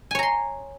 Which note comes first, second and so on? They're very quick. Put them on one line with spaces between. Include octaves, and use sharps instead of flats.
G#5 C#5 A#5 C6